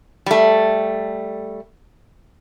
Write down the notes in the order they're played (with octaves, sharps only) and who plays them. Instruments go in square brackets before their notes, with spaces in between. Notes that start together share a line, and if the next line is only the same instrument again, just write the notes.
[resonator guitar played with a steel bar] G3 A3